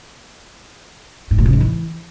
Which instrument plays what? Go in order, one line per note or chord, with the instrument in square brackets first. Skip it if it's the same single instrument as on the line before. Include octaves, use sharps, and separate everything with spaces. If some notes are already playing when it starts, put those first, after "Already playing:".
[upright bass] G#2
A#2
C#3
G#2
E3